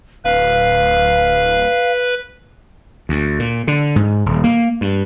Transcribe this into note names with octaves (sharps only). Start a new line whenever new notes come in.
D1 B4 F5
D2
A#2
D3
G#2
D#1
A#3
G2